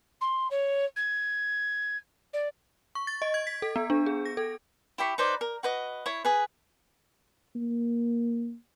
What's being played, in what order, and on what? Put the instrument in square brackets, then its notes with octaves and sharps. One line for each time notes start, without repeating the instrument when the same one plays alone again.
[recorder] C6
C#5
G#6
D5
[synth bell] C#6
A6
D#5
G#6
B6
A4
B3
D4
G#4
A#6
A4
[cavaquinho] E4 G4 B5 C#6
D#4 B4 C5 D5
A#4
F#4 B4 D#5
E4 C#5
G#4 B4
[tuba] A#3